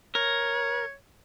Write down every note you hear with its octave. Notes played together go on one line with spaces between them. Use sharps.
A#4 C#5